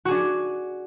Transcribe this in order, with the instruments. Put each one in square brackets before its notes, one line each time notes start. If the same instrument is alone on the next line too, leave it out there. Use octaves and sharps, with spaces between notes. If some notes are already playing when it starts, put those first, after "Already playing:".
[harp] F#4
G#4
D4